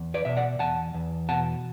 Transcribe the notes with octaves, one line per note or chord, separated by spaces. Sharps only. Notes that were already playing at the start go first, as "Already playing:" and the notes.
Already playing: E2
B4 D5
B2 E5
D5 F#5
E2 F#5 A5
E2
B2 F#5 A5